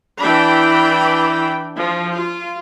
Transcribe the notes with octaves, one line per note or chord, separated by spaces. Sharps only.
E3 D4 G5 B5
F3
F4